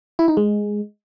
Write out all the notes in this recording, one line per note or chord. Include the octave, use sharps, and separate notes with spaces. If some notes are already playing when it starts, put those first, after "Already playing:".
E4
D#4
G#3